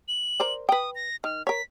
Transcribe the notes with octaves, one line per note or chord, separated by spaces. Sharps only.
F#7
A#4 C5 D5
B4 G5 D#6
A#6
D#3 F6
A#4 C#5 B6